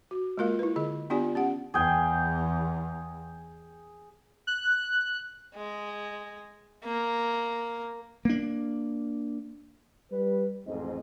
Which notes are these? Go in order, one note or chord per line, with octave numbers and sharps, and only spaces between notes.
F#4
G#3 A#3 F4 A#4 F5
E4 B4
D3 G#4 D#5
B3 D4 F4 G4 D5 G#5
C#4 G4 F#5
E2 G#4 G5
F#6
G#3
A#3
A#3 D4
G3 B4
A1 F2 G#2 C4 D#5